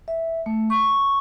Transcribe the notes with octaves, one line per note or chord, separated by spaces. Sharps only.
E5
A3
C#6